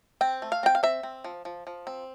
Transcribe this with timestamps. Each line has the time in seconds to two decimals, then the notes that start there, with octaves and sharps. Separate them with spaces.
0.21 C4 G5
0.42 A3
0.52 F5
0.63 C4 G5
0.75 F5
0.83 C4 E5
1.03 C4
1.24 F3
1.45 F3
1.67 F3
1.87 C4